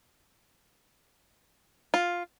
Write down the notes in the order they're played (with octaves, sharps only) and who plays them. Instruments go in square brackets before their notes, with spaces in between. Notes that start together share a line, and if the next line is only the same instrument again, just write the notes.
[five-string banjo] F4